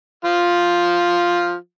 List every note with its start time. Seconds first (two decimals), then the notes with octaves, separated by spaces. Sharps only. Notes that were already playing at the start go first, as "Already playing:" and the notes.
0.24 F3 F4